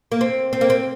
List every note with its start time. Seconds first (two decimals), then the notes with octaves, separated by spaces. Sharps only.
0.12 A#3
0.21 C4
0.53 C4
0.61 A#3
0.70 C4